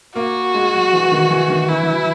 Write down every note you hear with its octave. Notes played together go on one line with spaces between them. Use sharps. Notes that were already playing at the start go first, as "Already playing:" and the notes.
A#3 F#4
G#3
F#3
E3
D#3
E3
D#3
E3 E4
E3
F#3